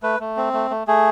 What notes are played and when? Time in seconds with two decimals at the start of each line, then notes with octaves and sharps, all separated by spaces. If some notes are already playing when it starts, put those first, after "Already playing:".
0.03 A3 B4
0.20 A3
0.37 C4
0.53 A3
0.70 A3
0.87 A3 G#4